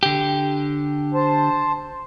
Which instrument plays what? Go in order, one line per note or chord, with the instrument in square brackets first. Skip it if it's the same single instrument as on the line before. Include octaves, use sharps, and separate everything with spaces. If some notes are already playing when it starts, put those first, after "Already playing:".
[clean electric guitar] D3 G4
[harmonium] C5 A5